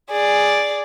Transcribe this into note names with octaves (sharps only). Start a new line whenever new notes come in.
G#4 D5